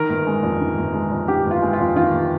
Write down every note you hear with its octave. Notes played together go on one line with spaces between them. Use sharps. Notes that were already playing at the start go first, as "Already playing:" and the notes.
Already playing: D#3 A#4
G1
G#3
F2
D#3
G1
G#3
F2
D#3 G4
G1
F4
G#3
F4
F2
D#3 F4
G1